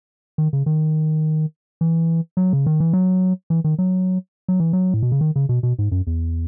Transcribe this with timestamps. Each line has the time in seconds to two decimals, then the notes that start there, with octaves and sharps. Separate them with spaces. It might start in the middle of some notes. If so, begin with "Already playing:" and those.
0.38 D#3
0.53 C#3
0.66 D#3
1.81 E3
2.37 F#3
2.53 C#3
2.66 D#3
2.80 E3
2.93 F#3
3.50 E3
3.64 D#3
3.79 F#3
4.48 F#3
4.60 E3
4.73 F#3
4.94 A2
5.03 B2
5.12 C#3
5.21 D#3
5.36 C#3
5.49 B2
5.63 B2
5.79 G#2
5.92 F#2
6.07 E2